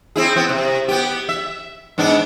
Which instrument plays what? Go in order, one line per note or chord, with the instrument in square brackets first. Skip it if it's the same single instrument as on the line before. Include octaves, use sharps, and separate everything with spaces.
[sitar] C4 E4 G#4
B3 C4
C3
B3 G4
E5
G#2 B3 D4